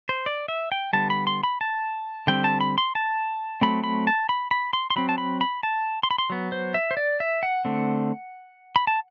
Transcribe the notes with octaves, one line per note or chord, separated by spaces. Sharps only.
C5
D5
E5
G5
D3 G3 B3 A5
B5
C6
B5
A5
D3 G3 C4 G5
A5
B5
C6
A5
F#3 A3 C4 B5
B5
A5
B5
B5
C6
C6
F#3 C4 B5
A5
B5
B5
A5
C6
B5
C6
F#3 B3
C5
E5
C5
D5
E5
F#5
D3 A3 C4
B5
A5